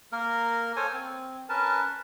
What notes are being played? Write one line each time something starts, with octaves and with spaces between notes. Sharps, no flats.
A#3 A#4
A4 C5 C#5 G#5
C4
C#4 A#4 B4 A5